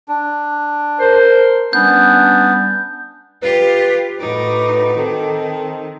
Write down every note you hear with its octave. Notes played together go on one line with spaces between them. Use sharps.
D4
A#4 C5
G3 B3 C#4 D4 G6
F4 G4 B4
A2 D#4 F#4 B4 D6
D#3 C4 D#4 A4